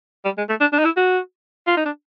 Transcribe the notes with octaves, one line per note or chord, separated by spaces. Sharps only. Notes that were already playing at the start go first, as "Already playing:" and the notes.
G3
G#3
A3
D4
D4
D#4
E4
F#4
F4
D#4
D4